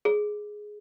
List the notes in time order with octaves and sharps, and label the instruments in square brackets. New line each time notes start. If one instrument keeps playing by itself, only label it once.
[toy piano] G#4